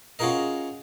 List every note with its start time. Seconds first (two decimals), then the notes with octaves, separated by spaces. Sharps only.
0.19 C#4 F4 F#4 G#4 A#4 D#5